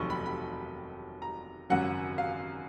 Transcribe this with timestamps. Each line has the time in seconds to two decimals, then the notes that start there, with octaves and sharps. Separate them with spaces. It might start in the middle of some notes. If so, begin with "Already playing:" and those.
Already playing: F1 D#2 D#3 F#3 C#6
0.10 B5
0.26 B5
1.22 A#5
1.70 G#1 F#2 C#3 F#3 F#5
2.18 F5